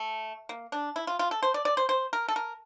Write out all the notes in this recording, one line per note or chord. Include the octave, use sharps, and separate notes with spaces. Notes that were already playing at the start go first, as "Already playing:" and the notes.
Already playing: A3
A#3
D4
E4
F4
F4
A4
C5
D5
D5
C5
C5
A#4
A4
A#4